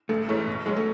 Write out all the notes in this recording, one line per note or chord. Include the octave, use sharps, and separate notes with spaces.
A1 A3
G#2 E3 A3 C#4
B2
F#3 G#3 C#4
A3